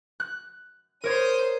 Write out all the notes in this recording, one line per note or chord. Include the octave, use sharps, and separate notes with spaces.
F#6
A#4 C5 C#5 D#6